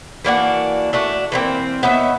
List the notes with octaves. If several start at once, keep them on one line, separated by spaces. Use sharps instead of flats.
E3 A#3 D4 F#4
A3 D4 F#4
E3 A#3 C4
B3 D#4 C#5 E5